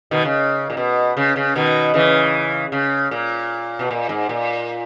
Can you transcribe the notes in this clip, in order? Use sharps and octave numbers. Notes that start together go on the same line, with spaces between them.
B2 D#3
C#3
A#2
B2
C#3
C#3
B2 D#3
C#3 E3
C#3
A#2
B2
A#2
G#2
A#2